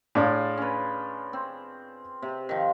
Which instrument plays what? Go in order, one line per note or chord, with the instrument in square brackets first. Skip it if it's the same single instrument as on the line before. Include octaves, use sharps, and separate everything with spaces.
[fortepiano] A2 D4 [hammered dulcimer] F4 G#4
[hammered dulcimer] C#4 B4
C4
C3
D#3 F3